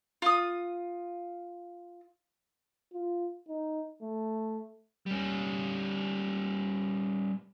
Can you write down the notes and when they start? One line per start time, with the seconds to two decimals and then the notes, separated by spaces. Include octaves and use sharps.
0.22 F4 D#6
2.93 F4
3.48 D#4
4.02 A3
5.06 G3 C#4